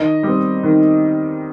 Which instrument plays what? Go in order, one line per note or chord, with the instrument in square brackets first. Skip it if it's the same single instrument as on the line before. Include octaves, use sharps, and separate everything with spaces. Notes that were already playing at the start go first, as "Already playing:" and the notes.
Already playing: [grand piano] D#3 D#5
G3 C4
D#3